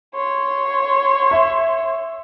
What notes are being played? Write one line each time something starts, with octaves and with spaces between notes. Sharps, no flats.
C#5 C6
E5